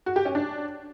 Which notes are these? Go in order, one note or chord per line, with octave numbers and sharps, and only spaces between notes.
F#4
G4
C#4
D4